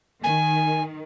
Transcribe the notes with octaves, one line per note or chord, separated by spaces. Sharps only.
D#3 G#5